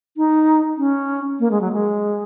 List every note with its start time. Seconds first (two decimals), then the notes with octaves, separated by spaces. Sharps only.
0.17 D#4
0.78 C#4
1.40 A#3
1.51 G#3
1.61 F#3
1.73 G#3